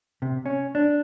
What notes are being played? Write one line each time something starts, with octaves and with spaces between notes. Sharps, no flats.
C3
C#4
D4